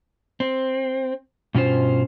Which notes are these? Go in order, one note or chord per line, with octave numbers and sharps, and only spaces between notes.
C4
G2 B2 C#4 F4 C5